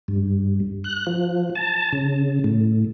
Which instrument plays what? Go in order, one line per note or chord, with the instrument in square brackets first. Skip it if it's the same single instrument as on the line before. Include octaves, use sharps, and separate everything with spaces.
[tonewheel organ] G2
F#6
F3
A5
C#3
A2